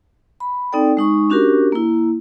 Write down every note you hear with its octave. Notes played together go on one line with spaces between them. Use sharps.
B5
C4 D#4 A4 D5 G5
G#3 D#4 C#6
C#4 D4 F#4 G4 A#4
A#3 E4